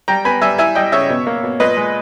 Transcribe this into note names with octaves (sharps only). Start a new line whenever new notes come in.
G3 G5 A#5
B3 G#5 B5
G3 E5 G#5
E4 E5 G#5
G3 D#5 G5
C#3 C#5 E5
B2
A#3
B2
A#2 B4 D#5
G#3